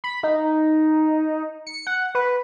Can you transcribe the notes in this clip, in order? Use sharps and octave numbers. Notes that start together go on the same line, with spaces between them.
B5
D#4
C#7
F#5
B4